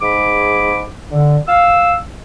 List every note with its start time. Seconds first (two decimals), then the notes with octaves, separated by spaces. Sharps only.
0.01 G#2 G#4 B5 D6
1.11 D3
1.48 F5 E6